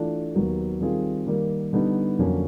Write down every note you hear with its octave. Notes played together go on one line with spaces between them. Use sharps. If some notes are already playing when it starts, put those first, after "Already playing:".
Already playing: E3 A3 D4 F4
D#2 D#3 F#3 B3
D#3 G3 C4 F4 G#4
D#3 G3 A#3
D3 G3 B3 D#4
F2 D3 F#3 A#3 C#4